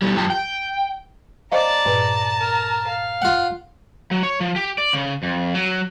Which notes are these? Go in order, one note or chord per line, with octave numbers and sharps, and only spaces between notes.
B2 G3
F#2 F4 G4 G5 A5
G5
C5 D5 D#5 F5 A5 A#5
G2 A#2 B4
A#4
F5
F4 F#5
F#3
C#5
F3
G4
D5
C#3
F2
F#3